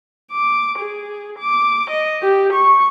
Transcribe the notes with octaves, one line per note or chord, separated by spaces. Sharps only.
D6
G#4
D6
D#5
G4
C#6